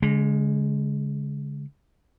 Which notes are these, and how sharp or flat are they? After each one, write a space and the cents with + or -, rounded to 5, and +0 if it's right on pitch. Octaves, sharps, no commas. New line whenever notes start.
D3 -45 G#3 +0